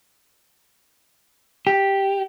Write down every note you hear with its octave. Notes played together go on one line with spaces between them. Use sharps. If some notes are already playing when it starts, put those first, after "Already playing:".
G4